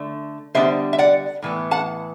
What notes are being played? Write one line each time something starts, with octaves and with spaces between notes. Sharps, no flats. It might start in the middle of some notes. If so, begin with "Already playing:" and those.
Already playing: D3 A3
D3 G3 B3 D4 C5 E5
E5
D5 F#5
A2 E3 B3
F#5 A5